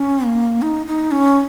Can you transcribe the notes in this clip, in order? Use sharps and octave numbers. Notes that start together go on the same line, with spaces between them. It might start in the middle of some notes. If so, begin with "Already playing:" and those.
Already playing: C#4
A#3
D#4
D#4
C#4